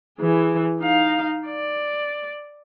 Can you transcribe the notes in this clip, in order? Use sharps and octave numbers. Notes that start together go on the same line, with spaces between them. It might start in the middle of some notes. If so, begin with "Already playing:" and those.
E3 G#4
D#4 F5
D5